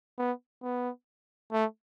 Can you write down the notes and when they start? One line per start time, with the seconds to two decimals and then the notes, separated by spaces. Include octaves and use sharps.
0.18 B3
0.63 B3
1.52 A3